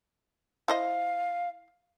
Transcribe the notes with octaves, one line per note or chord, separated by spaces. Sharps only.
E4 C5 D#5 F5